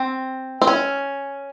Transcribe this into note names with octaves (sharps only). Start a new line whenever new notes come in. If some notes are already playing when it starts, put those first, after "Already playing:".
Already playing: C4
C4
C#4